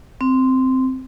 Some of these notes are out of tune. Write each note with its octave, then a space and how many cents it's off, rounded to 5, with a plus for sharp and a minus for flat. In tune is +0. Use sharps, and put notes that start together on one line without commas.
C4 -10